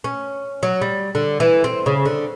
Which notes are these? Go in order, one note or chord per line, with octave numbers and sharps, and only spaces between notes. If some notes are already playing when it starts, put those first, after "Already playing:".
C#4
F#3
G3
D3
E3
C4
C#3
D3